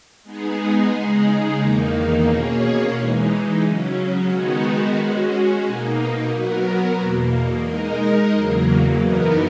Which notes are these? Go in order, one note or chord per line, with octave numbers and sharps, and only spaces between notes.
G#3 B3 D#4 G#4
C#3 G#3 D#4 G#4
E2 D#3 A#3 D#4
B2 A#3 C#4 G#4 C#5
E3 G#3 D#4
C#3 F#3 C#4
D#3 G#3 B3 D#4 F#4
G#3 C#4 F#4
B2 A#3 D#4
F#3 B3 F#4 A#4
E2 B2 A#3
G#3 D#4 A#4 D#5
E2 C#3 F#3 A#3
F#2 E3 B3 D#4 A#4